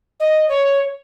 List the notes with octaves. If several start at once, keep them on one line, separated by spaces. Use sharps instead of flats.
D#5
C#5